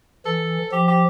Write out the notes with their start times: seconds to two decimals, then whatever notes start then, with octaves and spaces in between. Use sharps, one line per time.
0.26 E3 A4
0.72 F3 G4
0.87 G4